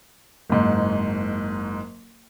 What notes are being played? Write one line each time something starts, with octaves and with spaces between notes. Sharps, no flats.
F#1 G#2